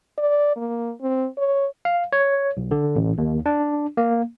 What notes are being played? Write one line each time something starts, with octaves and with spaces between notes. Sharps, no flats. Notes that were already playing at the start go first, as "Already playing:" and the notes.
D5
A#3
C4
C#5
F5
C#5
B1
D3
A1
D#2
D4
A#3